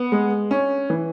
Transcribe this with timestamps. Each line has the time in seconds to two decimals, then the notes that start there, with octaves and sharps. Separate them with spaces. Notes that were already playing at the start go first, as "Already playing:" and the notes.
Already playing: B3
0.12 G#3
0.51 C#4
0.90 E3